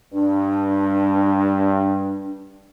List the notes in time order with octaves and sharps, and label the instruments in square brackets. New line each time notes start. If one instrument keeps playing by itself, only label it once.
[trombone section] G2 [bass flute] D4